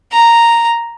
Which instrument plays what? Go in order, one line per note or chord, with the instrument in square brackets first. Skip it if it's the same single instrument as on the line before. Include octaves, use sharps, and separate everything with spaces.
[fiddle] A#5